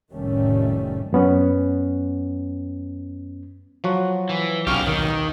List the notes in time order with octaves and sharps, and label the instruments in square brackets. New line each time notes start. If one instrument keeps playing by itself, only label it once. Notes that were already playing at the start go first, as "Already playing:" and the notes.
[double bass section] F1 A2 D#3 G3 A3 C#4
[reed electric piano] F#2 B3 C#4
[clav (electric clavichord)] F3 F#3 F#4
[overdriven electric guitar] E3
[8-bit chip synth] B1 [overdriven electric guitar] C#3 G4 [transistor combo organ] F5 C#6 F6
[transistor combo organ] D#2 [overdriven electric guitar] D#3